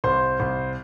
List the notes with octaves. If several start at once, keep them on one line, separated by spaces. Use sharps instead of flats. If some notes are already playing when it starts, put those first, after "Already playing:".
C2 C5 C6
C2